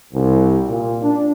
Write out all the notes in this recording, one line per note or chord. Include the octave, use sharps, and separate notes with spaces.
C2
A#2
D4